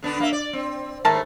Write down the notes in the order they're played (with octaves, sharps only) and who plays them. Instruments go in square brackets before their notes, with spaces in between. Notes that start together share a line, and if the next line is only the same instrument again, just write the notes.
[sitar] D3 B3 D4
A#3 E5
D5
C4
[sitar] D#2 G#2 [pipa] A3 A#4 A5